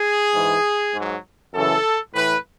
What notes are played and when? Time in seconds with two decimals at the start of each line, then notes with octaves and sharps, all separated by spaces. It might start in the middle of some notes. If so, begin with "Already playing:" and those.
Already playing: G#4
0.34 G#2 E3
0.95 G#2 F#3
1.54 F#2 C#3 E3 A4
2.14 A2 E3 B4